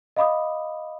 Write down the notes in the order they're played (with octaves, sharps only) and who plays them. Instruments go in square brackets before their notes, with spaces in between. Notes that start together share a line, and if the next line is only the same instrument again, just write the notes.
[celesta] D#5 F5 B5 D6 D#6